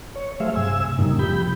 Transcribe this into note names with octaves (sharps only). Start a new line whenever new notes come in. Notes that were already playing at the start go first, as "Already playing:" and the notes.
C#5
F#3 A3 G#4 C5 E5 F5
G2 C3 G#5 E6
F#2 A2 C#3 G3 A#3 D#4
C3 F3 G4 B5 G6